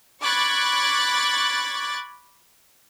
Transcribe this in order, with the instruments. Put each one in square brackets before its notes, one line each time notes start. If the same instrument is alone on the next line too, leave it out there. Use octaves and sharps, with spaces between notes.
[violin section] B5 C#6 D6 F#6 G#6 A6